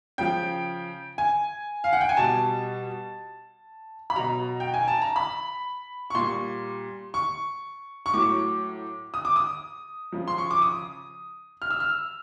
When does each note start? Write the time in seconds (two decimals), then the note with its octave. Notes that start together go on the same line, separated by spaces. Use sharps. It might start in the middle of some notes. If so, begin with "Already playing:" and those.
0.18 C#3 F3 G5
1.18 G#5
1.84 F5
1.93 F#5
2.01 G5
2.09 G#5
2.17 B2 G3 A5
4.10 B5
4.16 B2 F#3 A#5
4.60 G5
4.74 G#5
4.88 A5
5.02 A#5
5.16 B5
6.10 C#6
6.15 A#2 G3 C6
7.14 C#6
8.06 C#6
8.13 A2 F#3 D6
9.14 D#6
9.25 D6
9.36 D#6
10.12 C#3 F3
10.28 C6
10.38 C#6
10.51 D6
10.62 D#6
11.62 F6
11.70 E6
11.80 F6